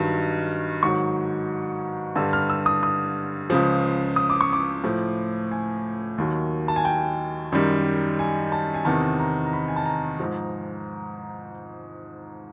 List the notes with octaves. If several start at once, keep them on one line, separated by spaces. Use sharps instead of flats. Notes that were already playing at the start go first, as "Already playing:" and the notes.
Already playing: G2 D#3 F#3
G#2 D#3 F#3 C#6
G2 D3 G3 E6
F6
E6
D#6
D#6
C#2 C#3 F3
D#6
D6
C#6
D6
A2 F3
G#5
D#2 D#3 F#3
A5
G#5
G5
F#2 D#3 G3
G#5
A5
G#5
E2 C3 D#3 A5
A#5
A#5
B5
G#5
A5
A#5
G#2 F3